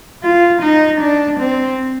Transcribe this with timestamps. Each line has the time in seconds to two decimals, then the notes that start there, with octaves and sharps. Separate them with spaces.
0.24 F4
0.62 D#4
1.01 D4
1.40 C4